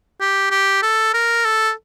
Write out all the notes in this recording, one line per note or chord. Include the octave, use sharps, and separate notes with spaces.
G4
G4
A4
A#4
A4